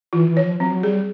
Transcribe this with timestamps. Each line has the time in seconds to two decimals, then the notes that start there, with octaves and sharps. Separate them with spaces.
0.13 E3 F4
0.28 E3
0.37 C#5
0.45 F3
0.60 F#3 C4
0.72 F#3
0.83 G3 G#4